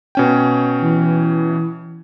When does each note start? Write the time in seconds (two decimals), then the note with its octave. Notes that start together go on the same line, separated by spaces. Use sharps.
0.15 B2 C#4 G5
0.82 E3